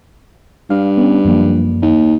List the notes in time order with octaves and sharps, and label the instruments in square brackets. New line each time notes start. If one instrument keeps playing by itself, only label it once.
[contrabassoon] G2 [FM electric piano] F5
[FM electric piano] B3 C#4
F#2 F3 A#3
[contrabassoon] D#2